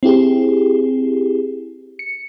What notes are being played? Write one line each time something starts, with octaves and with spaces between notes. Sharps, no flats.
C4 E4 G4 G#4
C#7